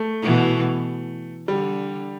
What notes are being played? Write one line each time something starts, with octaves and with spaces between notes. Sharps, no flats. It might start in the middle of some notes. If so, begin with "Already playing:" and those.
Already playing: A3
B2 E3
D3 G3